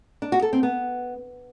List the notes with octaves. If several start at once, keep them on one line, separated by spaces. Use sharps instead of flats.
D4
F#4
A4
C4
B3